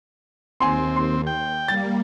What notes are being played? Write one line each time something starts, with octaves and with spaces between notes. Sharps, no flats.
D#2 C4 G#5 C6
C6
G5
G3 A#3 A6